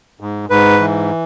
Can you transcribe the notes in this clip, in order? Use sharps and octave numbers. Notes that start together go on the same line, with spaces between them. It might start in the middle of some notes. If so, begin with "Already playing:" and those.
G#2
G#2 B4
E3